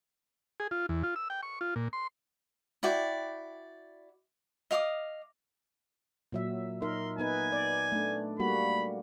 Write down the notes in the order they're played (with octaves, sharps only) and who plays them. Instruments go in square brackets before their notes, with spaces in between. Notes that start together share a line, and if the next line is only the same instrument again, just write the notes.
[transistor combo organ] G#4
F4
E2
F4
E6
G5
C#6
F4
A#2
C6
[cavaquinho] E4 F#4 D5 G5
D#5 F5 D6 D#6
[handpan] A#2 F#3 E5
[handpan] D#4 A#4 E5 [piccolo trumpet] C6
[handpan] B3 D#4 B4 [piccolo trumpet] G#5
[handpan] D5
A3 D4
[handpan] G3 A#3 F#4 [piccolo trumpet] B5